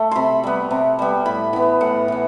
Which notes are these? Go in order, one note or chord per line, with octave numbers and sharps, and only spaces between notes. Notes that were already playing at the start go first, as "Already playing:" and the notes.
Already playing: A3 E5
C3 B5 C6
G3 B3
C3
G3 B3
A2 B5
E3 B3
A2 F#5
E3 B3